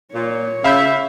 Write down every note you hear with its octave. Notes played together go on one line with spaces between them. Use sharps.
A#2 C#5
C#3 E5 F5 B5 G6